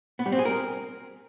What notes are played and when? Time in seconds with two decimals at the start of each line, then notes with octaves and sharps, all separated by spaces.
0.19 B3
0.26 G3
0.32 C4
0.39 G#4
0.45 A#4